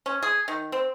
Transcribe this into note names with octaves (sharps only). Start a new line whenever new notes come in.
C#4
G#4
D#3
C4